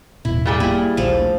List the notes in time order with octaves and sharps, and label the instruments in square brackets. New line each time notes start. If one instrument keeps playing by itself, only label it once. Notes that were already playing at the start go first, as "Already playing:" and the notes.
[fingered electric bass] E1 A1 B2 [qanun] E4
[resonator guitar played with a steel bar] A#2 G3 G#4
[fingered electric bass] A#3 [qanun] E4
[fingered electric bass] D#1 A#1 A#3 [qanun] F3 A4
[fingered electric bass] A3 D4